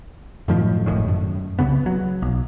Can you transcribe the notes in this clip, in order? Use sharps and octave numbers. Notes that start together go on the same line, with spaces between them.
F#2 A2 D#3 F3
D#1 G#1 A2 D#3
F#2
C2 F2 C#3 B3
F#3
B1